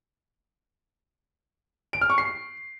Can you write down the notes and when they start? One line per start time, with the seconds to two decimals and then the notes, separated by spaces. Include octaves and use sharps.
1.93 D7
2.01 F6
2.10 C#6
2.18 C7